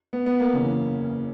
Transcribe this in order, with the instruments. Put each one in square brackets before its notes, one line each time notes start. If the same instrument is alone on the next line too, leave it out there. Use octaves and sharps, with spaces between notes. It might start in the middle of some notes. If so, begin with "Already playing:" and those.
[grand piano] B3
B3
A#3
[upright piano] F#1 E2 C#3